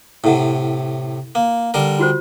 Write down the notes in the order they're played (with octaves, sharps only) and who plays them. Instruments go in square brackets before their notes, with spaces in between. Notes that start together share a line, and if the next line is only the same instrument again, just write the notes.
[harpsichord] A2 C3 [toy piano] E4 A4 F#5
[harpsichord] A#3
D3 G3 A#4
[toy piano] F4 F#4 C5